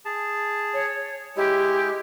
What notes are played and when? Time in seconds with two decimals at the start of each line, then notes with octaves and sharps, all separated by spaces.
0.05 G#4 A5
0.74 C#5
1.37 G#3 E4 G4